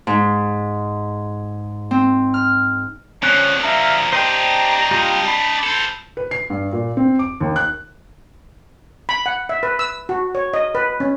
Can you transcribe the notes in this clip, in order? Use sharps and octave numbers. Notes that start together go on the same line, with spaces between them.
G#2
C4
F6
D3 F3 C#4 F#6
E5 F5 A#5
D4 G4 C5 D#5 G5 A#5
G3 F4 G4
B5
A4 C5
B4
C7
G2
A#2
C4
D6
D#2
F#6
B5
F#5
E5
B4
E6
F#4
C#5
D#5
B4
C#4